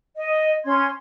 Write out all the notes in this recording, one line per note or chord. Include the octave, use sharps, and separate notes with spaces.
D#5
C#4 C6 G#6